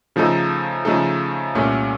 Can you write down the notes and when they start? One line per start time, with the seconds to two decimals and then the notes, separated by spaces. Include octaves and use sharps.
0.16 C#3 F3 A3 D#4 A4
0.85 C#3 F3 A3 D#4 A4
1.54 C2 A#2 A3 C#4